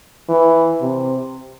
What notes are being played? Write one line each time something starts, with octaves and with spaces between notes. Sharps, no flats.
E3
C3